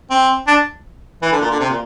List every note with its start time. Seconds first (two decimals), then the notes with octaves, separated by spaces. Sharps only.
0.10 C4
0.48 D4
1.23 E3
1.32 D3
1.42 A#2
1.51 D3
1.60 C3
1.70 A#2